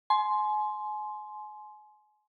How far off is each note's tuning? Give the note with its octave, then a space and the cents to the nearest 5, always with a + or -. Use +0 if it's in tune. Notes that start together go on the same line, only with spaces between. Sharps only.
G#5 +35 C6 +0